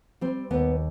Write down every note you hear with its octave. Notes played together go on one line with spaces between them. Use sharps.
G3 C4
D#2 B3